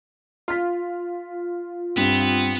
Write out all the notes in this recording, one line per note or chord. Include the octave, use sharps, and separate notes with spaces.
F4 F6 B6
G2 B3 C4